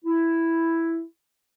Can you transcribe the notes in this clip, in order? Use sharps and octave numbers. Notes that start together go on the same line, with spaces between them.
E4